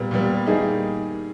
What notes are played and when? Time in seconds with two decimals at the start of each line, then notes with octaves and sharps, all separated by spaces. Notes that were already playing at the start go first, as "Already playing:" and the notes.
Already playing: A#2 G3 B3
0.11 A#2 G3 B3
0.47 D#3 G3 A#3 D#4 G#4